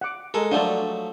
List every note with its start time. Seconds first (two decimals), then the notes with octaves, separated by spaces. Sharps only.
0.01 F#5 D6
0.34 G#3 A4 A#4
0.52 F3 F#3 A3 D4 A5